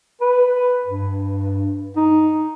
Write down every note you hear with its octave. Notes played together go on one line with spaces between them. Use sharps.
B4
G2
D#4